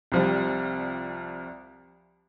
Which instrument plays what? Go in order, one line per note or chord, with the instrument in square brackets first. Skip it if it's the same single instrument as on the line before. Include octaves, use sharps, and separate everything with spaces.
[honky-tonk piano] C2 F3 G3